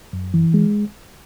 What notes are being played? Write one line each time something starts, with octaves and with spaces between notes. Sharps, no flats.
F#2
E3
G#3